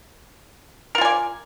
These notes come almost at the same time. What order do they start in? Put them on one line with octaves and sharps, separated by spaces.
A#4 F4 G#5 D5